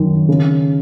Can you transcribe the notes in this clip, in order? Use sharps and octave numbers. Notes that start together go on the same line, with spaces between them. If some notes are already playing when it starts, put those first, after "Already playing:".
Already playing: F#2 D#3
C#3